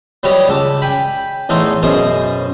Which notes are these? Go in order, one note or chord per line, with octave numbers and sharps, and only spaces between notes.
F#3 G3 G4 B4 C#5 D#5
C#2 A4 D6
G5 G#5 B5
E2 A2 D#4 A4 C6
F#2 B2 G#4 C5 D#6